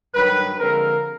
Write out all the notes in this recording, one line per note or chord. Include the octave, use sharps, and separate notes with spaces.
G2 D#3 F#3 B4
D3 F3 G#3 C4 A#4